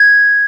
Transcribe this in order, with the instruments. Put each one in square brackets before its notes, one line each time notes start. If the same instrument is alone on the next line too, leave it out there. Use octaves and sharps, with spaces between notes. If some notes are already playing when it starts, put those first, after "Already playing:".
Already playing: [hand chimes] G#6